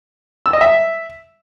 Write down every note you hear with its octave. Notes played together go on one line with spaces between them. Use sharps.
E6
D#5
E5